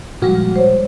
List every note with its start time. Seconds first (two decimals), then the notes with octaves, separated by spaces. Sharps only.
0.22 A#2 F3 G3 G#3 F#4
0.56 C5 C#5